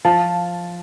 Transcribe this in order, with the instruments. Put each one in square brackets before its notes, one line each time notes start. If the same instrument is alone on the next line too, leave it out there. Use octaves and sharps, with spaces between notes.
[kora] F3 [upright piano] A5